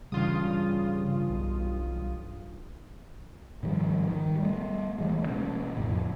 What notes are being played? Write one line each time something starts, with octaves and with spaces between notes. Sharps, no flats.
G2 C#3 E3 G3 F4 D#6
B1
G#2 D#3 F3 G3
D#3
G3 A3
D2 E3 G3 G#3
B2 A#3 C#4
F2 A2 C#3